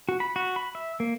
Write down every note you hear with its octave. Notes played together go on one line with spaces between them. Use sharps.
F#4
B5
F#4
B5
E5
A#3